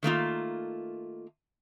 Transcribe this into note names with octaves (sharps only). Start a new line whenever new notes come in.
D#3 A3 A#3 F4